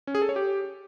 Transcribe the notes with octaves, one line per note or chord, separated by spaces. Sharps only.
C#4
G#4
A4
C#5
G4